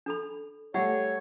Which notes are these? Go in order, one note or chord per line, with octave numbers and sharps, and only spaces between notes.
D4 A4 B5
G3 A3 C#5 E5 F#5